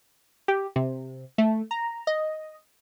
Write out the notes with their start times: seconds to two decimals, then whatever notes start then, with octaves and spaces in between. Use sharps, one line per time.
0.48 G4
0.76 C3
1.38 A3
1.71 A#5
2.07 D#5